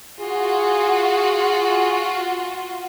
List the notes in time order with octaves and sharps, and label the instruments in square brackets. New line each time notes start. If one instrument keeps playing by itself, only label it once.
[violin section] F4 F#4 [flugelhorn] G#4